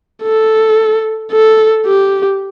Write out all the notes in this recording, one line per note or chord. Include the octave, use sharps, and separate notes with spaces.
A4
A4
G4